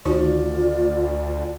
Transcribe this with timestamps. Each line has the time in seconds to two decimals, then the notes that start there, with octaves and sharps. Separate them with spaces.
0.05 D2 D#3 D#4 F4 F#4 D5